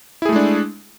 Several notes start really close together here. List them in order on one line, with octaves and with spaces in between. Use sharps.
E4 G#4 A3 G#3 D4